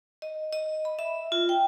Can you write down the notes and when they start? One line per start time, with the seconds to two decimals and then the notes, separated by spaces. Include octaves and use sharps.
0.22 D#5
0.53 D#5
0.85 B5
0.99 E5
1.32 F4
1.49 G5